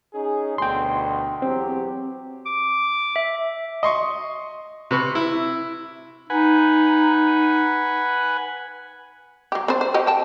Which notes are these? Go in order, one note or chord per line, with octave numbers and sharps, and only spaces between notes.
C#4 D#4 G#4
D2 B2 G5 C6
E2 F#3 C4 G4
D6
E5
D#5 C6 C#6
C3 B4 C#6
E4
D#4 B4 F#5 G#5
F#3 G4
C4 D4 C5
C5
F#4 G4 D#5
G5 A5